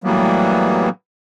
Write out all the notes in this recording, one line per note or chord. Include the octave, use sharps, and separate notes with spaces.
A2 E3 F#3 G3 A#3 B3